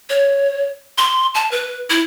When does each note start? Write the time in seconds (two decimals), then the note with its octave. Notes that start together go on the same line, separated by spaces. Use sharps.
0.10 C#5
0.98 C6
1.35 A5
1.51 B4
1.90 E4